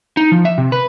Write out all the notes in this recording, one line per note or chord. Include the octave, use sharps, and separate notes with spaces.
D#4
F3
E5
C3
B4